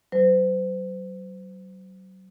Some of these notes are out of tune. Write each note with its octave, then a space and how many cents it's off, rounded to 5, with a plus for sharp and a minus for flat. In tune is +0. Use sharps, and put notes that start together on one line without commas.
F#3 +30 C5 -35